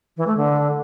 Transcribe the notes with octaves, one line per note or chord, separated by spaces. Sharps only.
E3
A3
D3